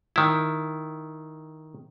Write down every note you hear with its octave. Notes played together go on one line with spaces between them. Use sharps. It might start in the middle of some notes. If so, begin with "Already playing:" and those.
D#3 E4